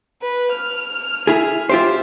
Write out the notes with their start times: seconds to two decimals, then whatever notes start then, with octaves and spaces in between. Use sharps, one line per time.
0.22 B4
0.52 F6
1.27 E4 G#4
1.69 F4 G4 C5 E5